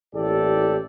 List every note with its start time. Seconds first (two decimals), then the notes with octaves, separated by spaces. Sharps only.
0.15 A1 A#2 E4 G4 A4 D5